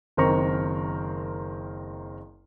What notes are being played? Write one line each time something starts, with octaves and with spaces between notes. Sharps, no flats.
F#1 D#3 C4 A#4 A#5 C#6